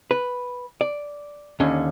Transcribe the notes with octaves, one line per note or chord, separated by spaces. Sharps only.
B4
D5
D#2 D3 C#4